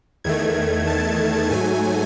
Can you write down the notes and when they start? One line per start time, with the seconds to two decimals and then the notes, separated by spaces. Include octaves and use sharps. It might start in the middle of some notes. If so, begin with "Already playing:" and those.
0.24 E2 D#3 A3 G#6
0.87 A5
1.51 G#2 F#3 A3 G#5